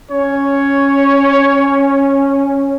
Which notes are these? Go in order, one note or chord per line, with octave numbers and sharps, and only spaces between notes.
C#4 C#5